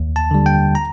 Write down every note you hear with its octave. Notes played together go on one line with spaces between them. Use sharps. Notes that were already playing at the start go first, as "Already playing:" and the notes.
Already playing: D#2
A5
D3 G3
G5
A#5